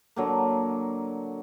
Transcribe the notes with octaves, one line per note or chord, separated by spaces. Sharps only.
D3 F#3 A#3